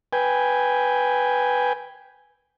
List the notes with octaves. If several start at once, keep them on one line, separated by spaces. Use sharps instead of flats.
B4 G5 G#5